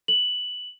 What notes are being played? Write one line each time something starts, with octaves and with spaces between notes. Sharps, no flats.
F#7